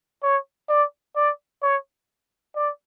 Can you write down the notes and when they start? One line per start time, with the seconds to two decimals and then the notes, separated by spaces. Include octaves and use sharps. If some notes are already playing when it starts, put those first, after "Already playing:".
0.23 C#5
0.69 D5
1.16 D5
1.62 C#5
2.56 D5